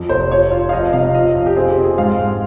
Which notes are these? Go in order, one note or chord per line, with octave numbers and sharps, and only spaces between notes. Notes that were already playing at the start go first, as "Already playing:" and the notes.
Already playing: F2
F1 C5
F4 C#5
F4
F5
F2 D#5
C3 F5
F3 D#5
F2 D#5
G4
C4 G#4
G4
C4
G#4
G#2 F5
G#2